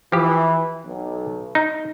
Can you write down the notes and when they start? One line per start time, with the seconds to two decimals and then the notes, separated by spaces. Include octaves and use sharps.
0.12 E3 F3 G4
0.85 B1
1.55 D#4